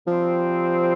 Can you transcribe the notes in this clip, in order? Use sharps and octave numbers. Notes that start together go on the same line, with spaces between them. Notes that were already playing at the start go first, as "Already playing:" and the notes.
C3 F3 G3 C4